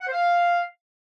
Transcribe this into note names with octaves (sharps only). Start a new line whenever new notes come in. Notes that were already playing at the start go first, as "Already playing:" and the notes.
F#5
C5
F5